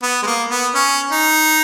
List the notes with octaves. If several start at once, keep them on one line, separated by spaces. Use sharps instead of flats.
B3
G#3
A#3
B3
C#4
D#4